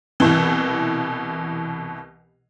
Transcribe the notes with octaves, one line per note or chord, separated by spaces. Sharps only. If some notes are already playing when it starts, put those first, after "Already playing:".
C2 B2 E3